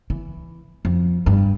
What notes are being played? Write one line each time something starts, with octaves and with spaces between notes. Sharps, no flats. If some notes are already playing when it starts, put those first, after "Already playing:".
E3
F2
G2